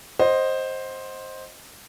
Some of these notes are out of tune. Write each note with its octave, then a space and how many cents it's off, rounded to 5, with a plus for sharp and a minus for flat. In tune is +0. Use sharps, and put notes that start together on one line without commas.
C5 +10 D#5 +0 F#5 +0